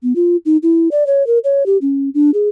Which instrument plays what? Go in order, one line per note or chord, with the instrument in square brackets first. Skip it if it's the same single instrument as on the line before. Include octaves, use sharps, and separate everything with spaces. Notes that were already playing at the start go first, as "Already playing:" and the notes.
[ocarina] B3
F4
D#4
E4
D5
C#5
A#4
C#5
G4
C#4
D4
G#4